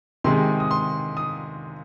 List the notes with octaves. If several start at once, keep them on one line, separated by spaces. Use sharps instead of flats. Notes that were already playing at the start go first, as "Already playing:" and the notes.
C3 D#3 G#3 C6
D#6
C6
D#6